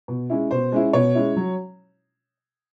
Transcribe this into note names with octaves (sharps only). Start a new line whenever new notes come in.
B2
G#3 C#4 E4
B2 C5
G#3 C#4 E4
B2 C#5
G#3 C#4 E4
F#3